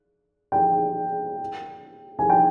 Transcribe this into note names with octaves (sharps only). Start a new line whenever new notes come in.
G5
G#5
G5